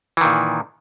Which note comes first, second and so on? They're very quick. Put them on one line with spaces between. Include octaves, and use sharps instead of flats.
E3 D#3 A#2